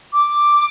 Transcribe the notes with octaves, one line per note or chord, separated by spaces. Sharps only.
D6